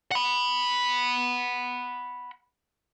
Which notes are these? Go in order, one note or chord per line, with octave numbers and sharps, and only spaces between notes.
F#5 B5